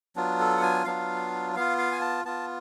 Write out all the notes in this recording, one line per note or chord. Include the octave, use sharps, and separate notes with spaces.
F#3 B3 D4 F4
A4
F#5
G#5
F#3 B3 D4 F4 F5
B3 F4 F5
F5
G#5
A5
B3 F4 A5